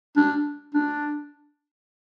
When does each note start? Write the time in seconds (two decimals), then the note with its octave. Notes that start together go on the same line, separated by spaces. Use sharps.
0.16 D4
0.74 D4